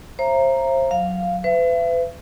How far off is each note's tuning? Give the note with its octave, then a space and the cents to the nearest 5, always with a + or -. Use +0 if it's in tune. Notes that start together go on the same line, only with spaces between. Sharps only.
C5 +35 E5 +40 A#5 +0
F#3 -10 F5 -10
B4 +40 E5 +40